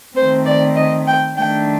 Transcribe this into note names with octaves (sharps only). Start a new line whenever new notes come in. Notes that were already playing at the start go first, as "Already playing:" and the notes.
D#3 A3 C4 C5
D5
D#5
G5
D#3 A3 D4 G5